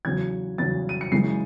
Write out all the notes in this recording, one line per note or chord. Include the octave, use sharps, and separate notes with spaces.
E2 C#3 F#3 G#6
E2 C#3 F#3 A6
D#7
C#7
F#2 C#3 E3 G#3 C7